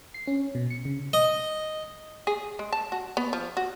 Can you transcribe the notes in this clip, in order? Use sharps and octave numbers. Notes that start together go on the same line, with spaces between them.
C7
C#4
B2
C#7
C#3
D#5
G#4
G#3
A5
F#4
B3
F3
F#4